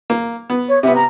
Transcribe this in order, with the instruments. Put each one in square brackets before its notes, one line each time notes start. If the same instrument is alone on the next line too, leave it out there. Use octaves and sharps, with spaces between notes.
[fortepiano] A#3
B3
[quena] C#5
[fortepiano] C3 B3 [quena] E5
[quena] A#5